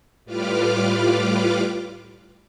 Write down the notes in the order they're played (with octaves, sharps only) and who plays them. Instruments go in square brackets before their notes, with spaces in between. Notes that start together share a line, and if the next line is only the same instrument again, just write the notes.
[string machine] A2 G3 F4 B4 D6 F6